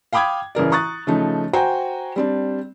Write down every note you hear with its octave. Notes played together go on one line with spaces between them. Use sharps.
F5 G5 B5 D6 D#6 G#6
A1 C#3 A#4 D5
A#5 C#6 D#6 F#6 A6
C#3 F3 A3 D#4
F#4 C5 G5 G#5 A#5
G3 C4 D4